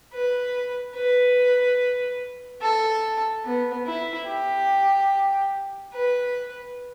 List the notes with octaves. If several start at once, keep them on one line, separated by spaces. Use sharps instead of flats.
B4
B4
A4
B3
E4
G4
B4